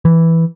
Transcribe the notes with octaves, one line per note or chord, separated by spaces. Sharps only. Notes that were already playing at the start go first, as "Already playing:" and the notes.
E3